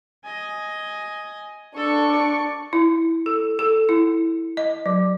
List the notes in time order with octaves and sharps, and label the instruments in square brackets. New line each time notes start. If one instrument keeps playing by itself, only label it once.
[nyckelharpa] D#5 G#5
[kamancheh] D4 C#6 [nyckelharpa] A4
[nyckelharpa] D5
[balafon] E4
A4
A4
E4
D#5
F#3